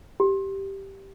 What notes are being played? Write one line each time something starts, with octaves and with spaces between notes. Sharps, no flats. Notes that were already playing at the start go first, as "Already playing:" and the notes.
G4